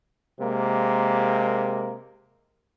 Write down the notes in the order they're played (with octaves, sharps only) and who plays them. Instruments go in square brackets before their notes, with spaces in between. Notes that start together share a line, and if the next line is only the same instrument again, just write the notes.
[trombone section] C3 G#3 A#3